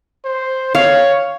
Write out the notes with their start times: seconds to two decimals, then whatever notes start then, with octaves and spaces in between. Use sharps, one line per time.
0.24 C5
0.75 C#5 F5